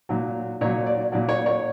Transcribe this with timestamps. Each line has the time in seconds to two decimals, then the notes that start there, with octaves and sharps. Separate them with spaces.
0.09 A#2 F#3
0.61 A#2 F#3 C#5
0.86 D5
1.12 A#2 F#3 D5
1.29 C#5
1.46 C#5